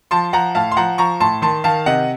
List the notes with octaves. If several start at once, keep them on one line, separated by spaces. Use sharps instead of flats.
F3 A5 C6
F3 F#5 A#5
A2 F5 A5
C6
F3 F#5 A#5
F3 A#5 C#6
A2 A5 C6
D#3 A5 C6
D#3 F5 A5
C3 D#5 F#5